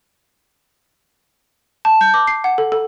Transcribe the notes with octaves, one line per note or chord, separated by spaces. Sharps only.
A5
G6
D6
C7
F#5
A4
A4